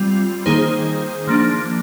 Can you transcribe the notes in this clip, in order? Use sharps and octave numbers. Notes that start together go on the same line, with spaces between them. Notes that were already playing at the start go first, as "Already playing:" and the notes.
Already playing: G3 C4 F4
D#3 A#3 D#4 G#4 C5
F3 A#3 D4